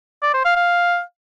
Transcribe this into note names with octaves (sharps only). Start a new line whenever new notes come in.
D5
C5
F5
F5